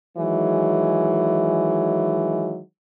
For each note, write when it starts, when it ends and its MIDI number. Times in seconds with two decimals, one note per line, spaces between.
0.18 2.60 51
0.18 2.60 52
0.18 2.60 54
0.18 2.60 56